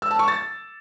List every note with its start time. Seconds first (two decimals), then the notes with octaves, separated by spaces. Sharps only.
0.02 E6
0.11 A5
0.19 C#6
0.28 A6